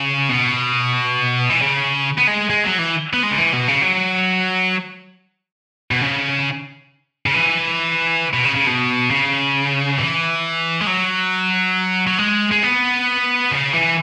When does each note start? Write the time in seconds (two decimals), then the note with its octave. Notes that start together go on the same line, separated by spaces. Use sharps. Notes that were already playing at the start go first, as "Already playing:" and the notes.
Already playing: C#3
0.29 B2
1.50 E3
1.62 C#3
2.18 B3
2.28 G#3
2.50 G#3
2.64 F#3
2.79 E3
3.13 B3
3.23 G#3
3.31 C#3
3.38 E3
3.53 B2
3.68 C#3
3.82 F#3
5.91 B2
6.02 C#3
7.26 C#3
7.34 E3
8.33 B2
8.44 C#3
8.56 C#3
8.67 B2
9.11 C#3
9.98 E3
10.81 G#3
10.87 F#3
12.07 F#3
12.18 G#3
12.51 G#3
12.63 B3
13.51 C#3
13.73 E3